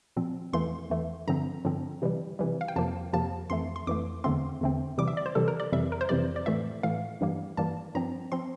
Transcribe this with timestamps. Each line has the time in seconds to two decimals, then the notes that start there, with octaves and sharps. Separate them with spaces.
0.17 A#2 F3 C4
0.53 E2 E3 A3 C6
0.90 E2 E3 A3
1.27 G2 D3 F3 C4 A#5
1.65 G2 D3 F3 C4
2.02 C3 E3 G3
2.39 C3 E3 G3
2.61 F5
2.68 G5
2.76 F2 C3 F3 A#3 A5
3.13 F2 C3 F3 A#3 A5
3.50 F2 E3 A3 C6
3.76 C6
3.87 F2 E3 A3 D6
4.24 E2 D3 A3 C4 C6
4.61 E2 D3 A3 C4
4.98 C3 E3 G3 D6
5.08 E5
5.17 D5
5.26 C5
5.35 C3 E3 G3 A4
5.48 A#4
5.60 D5
5.72 F2 C3 E3 G3 E5
5.92 A#4
6.01 C5
6.09 F2 C3 E3 G3 D5
6.36 D5
6.46 A2 E3 A3 E5
6.83 A2 E3 A3 F5
7.21 G2 E3 G3 A#3
7.57 G2 E3 G3 A#3 A5
7.95 G2 F3 C4 A#5
8.32 F3 C4 C6